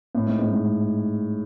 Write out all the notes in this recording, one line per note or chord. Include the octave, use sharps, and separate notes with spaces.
A2
G#2
G#2
G#2